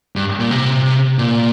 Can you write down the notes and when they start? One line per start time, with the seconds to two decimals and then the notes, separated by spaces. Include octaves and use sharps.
0.16 G2
0.40 A#2
0.51 C3
1.19 A#2